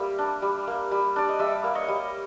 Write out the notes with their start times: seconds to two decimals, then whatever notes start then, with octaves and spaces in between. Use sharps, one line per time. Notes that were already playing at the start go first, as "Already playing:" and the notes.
Already playing: G3 A#3 E5
0.18 D4
0.42 G3
0.67 A#3
0.92 G3
1.16 D4 D5
1.29 D#5
1.39 G3 D5 E5
1.64 A#3
1.75 C#5 D#5
1.88 G3